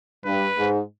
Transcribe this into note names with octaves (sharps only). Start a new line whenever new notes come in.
G2 B4
G#2